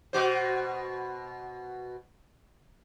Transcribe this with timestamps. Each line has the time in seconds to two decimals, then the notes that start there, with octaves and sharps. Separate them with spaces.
0.13 B2 F#4 C5